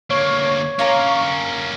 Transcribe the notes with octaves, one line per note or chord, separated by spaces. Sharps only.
D2 A#3 C#5
A#3 C#4 F4 A#4 A#5